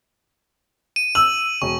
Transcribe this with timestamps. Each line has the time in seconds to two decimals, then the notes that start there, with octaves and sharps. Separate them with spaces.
0.96 D#7
1.15 E6 F#7
1.62 E1 C#6